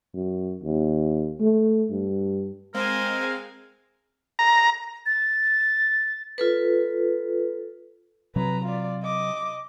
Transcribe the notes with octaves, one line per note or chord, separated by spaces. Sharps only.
F#2
D#2
A3
G2
G#3 C4 A#4 C5 F5 G#5
A#5
A6
F4 A4 B4
C3 F#3 B4 A#5
F4 D5
D#5 D6